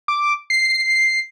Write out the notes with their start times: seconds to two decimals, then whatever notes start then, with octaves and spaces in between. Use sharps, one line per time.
0.08 D6
0.50 C7